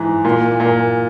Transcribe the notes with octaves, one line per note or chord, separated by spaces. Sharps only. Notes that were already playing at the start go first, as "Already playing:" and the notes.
Already playing: G#2 E3
A#2
A#2